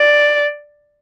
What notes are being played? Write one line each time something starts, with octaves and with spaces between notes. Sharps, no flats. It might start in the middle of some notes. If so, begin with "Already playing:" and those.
Already playing: D5